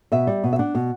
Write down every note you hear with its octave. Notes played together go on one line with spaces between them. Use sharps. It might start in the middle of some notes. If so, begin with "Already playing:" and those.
B2 E5
G3
B2
E5
D4 F#5
B2